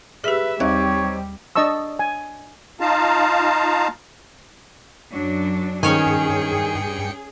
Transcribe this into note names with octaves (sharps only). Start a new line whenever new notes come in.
G4 G#4 B4 E5
D#2 G3 C4 D#4 G4 C#5 F5 G#6
D4 D#5 A5 C#6 E6
G#5
D#4 F4 F5 A5 A#5
F#2 F#3 D4
G2 D#3 C#4 G#4 C#5 G5 G#5 C#7